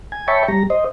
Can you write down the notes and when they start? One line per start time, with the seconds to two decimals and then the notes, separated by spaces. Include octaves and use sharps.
0.12 G#5
0.28 C#5 E5 G5 A5 B5 C#6
0.48 G3 A#5
0.70 C5 D#5